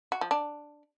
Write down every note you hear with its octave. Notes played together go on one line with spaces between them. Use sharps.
F#4
F3
D4